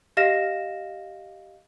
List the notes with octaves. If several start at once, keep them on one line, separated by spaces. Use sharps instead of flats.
G4 D#5 F5 F6 A#6 E7